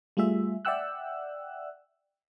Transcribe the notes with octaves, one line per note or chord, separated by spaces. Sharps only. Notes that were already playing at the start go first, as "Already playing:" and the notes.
G3 A3 F4 G#4 E5
D5 E5 F#5 G5 E6 F#6